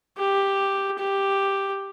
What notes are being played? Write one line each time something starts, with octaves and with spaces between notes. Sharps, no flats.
G4
G4